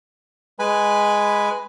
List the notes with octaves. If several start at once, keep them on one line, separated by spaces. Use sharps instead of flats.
G#3 B4 G#5 B5